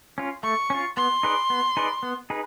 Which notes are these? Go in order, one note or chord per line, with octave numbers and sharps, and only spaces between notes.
C#4 F4
A3 C#6
C#4 F4
B3 C6
D#4 G#4 B4 D5
B3
D#4 G#4 B4 D5
B3
D#4 G#4 B4